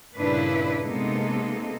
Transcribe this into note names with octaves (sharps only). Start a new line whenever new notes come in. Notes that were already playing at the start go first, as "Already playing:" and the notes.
G2 A#2 C#3 D4 E4 B4
C3 G#3 A#3 B3 D#4 A4